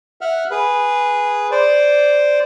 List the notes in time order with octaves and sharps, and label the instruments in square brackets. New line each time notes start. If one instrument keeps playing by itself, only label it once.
[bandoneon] E5 F#5 F6
G#4 B4
C5 D5